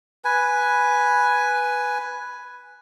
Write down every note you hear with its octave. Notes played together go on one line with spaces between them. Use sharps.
B4 G#5